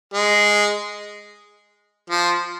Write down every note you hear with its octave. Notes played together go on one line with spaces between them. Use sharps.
G#3
F3